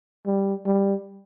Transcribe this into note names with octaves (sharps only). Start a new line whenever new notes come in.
G3
G3